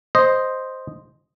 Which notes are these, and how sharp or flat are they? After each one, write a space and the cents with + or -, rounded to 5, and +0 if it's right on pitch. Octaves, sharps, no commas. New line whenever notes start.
C5 +0 D#5 +0